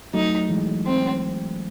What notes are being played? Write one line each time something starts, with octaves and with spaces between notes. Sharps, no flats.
F#3 A3 D#4
E3 G#3
C4